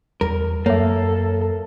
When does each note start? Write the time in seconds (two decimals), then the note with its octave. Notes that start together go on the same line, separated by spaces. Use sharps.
0.21 E2 G3 A#4
0.66 F#2 A#3 A4 C#5 E5